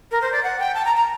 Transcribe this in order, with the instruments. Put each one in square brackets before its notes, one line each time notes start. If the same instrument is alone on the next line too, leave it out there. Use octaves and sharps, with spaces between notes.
[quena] A#4
C5
D5
F#5
G5
A5
A#5
A#5